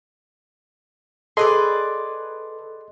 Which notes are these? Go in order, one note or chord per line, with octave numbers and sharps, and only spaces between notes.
G#4 A4 B4 D5 D#5 C6